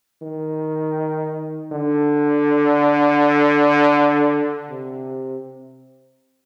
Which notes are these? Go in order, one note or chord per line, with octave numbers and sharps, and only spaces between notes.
D#3
D3
C3